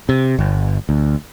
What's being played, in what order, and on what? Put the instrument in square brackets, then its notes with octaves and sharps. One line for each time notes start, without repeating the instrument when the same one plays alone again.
[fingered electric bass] C3
G1
D2